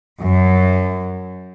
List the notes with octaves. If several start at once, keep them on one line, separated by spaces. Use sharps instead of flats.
F#2